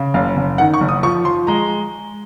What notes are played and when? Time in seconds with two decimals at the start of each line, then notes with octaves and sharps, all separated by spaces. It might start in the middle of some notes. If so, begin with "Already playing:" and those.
Already playing: C#3
0.14 F#1 F5
0.37 F#1
0.58 D#3 F#5
0.74 C#6
0.81 F#1
0.89 D#6
1.03 F3 C#6
1.25 F3 C6
1.47 G#3 A#5